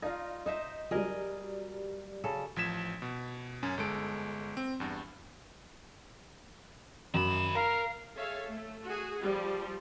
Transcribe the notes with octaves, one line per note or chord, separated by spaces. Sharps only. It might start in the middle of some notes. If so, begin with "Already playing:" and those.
D#4 F4 D5 F5 A#6
D#4 C5 D#5 E5
F#3 G3 G#4 A#4 D#5
C#3 A4
A1 F3 G#6 B6 E7
B2
F#2 C#4
G1 G#3 A4 D7
C4
E2 G2
F#2 D#3 B5 E7
A#4 F5 A#5
G#4 A4 C#5 E5 F5
A3
F#4 G#4
F3 G3